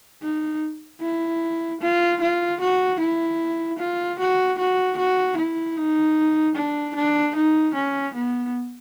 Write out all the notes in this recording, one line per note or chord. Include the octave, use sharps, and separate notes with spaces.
D#4
E4
F4
F4
F#4
E4
F4
F#4
F#4
F#4
E4
D#4
D4
D4
D#4
C#4
B3